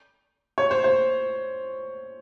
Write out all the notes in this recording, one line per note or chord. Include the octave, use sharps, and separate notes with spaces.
C#5
C5
C5